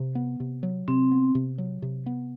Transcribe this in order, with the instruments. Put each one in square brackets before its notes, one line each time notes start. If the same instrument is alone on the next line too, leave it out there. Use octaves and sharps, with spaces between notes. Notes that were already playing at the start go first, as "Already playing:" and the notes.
Already playing: [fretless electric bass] C3
B3
C3
F#3
[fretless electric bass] C3 [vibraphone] C4
[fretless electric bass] B3
C3
F#3
C3
B3